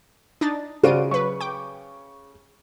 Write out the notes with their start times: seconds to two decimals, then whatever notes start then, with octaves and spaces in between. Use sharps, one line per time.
0.41 D4 D#4 A6
0.83 C#3 F4 F#4 C5 D5 D7 D#7
1.11 F#3 B4 C#6
1.41 G5 D6